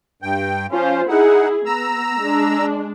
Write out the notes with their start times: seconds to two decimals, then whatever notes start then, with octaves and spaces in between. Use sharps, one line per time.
0.22 G2 G5
0.71 F3 C#4 F4 C5
1.09 D#4 E4 G#4 F#5
1.66 B3 A#5 E6
2.21 G#3 D4